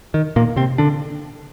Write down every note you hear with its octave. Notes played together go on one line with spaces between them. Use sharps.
D#3
A#2 A#3
C3 C4
D3 D4